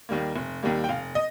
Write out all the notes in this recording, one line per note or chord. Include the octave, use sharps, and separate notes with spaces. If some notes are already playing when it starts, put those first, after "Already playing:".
D#2 D#3 G3 A#3
F1
D#2 D#3 G3 A#3
G5
F1 F5
D#5